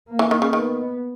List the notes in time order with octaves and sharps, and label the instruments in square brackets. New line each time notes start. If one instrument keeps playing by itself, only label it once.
[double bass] A#3
[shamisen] E3
D#3
C#3
[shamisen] D#3 [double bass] B3